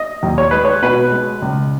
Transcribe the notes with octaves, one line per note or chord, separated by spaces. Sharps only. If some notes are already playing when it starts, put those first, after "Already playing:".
Already playing: D#5
D#2
C#5
G#3 B4
C#5
B2 B4
G#3
C#2